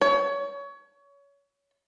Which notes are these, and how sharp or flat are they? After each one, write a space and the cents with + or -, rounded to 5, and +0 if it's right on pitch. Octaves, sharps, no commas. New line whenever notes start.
C#5 +25